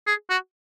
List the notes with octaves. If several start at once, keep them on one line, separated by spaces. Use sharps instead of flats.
G#4
F#4